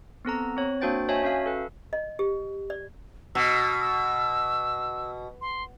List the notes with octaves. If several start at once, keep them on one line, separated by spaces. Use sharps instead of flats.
B3 C4 A4 A#5
C4 C#5
A#3 D4 F#4 C5 G5 A6
F#4 C#5 D#5 E5 G#5 A5
C#4 F#4 E5 F5
A4 B4
D#5
G4
D5
B2 E6
E6
C6